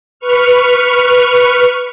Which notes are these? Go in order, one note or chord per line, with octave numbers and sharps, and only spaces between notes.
B4 C#6 F6